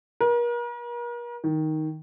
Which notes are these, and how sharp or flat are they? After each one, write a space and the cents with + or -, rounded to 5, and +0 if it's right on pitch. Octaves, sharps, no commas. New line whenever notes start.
A#4 +40
D#3 +5